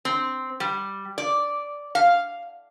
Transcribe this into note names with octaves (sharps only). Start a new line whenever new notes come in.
C4
G3
D5
F5